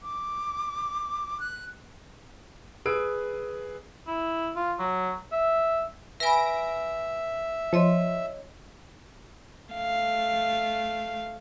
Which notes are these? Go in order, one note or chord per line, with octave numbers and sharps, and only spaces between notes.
D6
F#6
G#4 B4 D#6 E6 D7
E4
F4
F#3
E5
B4 E5 G#5 B5 A#6 D7
F3 C#5 D#5 C6
A3 F5